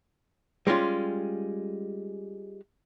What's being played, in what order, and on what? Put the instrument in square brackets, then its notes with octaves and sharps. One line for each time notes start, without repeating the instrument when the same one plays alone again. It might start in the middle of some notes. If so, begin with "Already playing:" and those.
[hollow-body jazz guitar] G3 G#3 C#4 F4